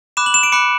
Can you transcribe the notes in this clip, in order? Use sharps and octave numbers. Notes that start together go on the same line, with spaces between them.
B5 D6 F#6 E7
F#7
E7
D7
B5 D6 F#6 C#7